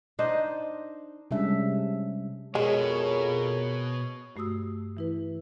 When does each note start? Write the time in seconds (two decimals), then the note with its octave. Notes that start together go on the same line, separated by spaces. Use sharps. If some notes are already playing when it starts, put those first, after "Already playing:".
0.19 D4 D#4 C5 D#5
1.31 C3 G3 G#3 C#4 D4 E5
2.55 F2 B2 G#3 G#4 A#4 C#5
4.36 G2 A3 F#4 D#6 E6
4.97 E3 E4 B4